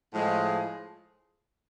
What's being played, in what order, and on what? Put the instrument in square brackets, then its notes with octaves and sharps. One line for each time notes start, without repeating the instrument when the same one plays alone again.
[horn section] A2 F3 G#3